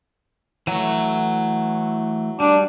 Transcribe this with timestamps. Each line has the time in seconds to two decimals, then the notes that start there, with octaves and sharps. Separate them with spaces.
0.67 E3 F#3 A3
2.40 G3 D4